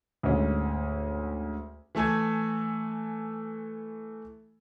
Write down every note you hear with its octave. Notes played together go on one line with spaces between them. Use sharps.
D2 G#2 C#4
E3 A3 A4 G#5 G#6